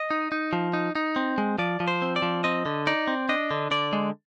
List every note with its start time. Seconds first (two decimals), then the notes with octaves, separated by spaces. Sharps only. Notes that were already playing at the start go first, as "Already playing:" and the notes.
Already playing: D#5
0.11 D#4
0.32 D#4
0.53 F3
0.73 D#4
0.95 D#4
1.16 C4
1.38 G#3
1.59 F3 D5
1.80 F3
1.88 C5
2.02 C4
2.16 D5
2.22 F3
2.44 C4 D#5
2.66 D3
2.87 D#4 D5
3.08 C4
3.29 D4 D#5
3.51 D3
3.71 D3 D5
3.93 G#3